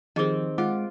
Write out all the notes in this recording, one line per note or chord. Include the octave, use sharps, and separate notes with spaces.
D#3 F3 C4 G4 G#4 D#5
G#3 F4 F#5 D6